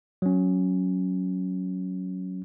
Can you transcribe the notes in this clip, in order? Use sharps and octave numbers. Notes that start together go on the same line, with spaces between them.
F#3 C#4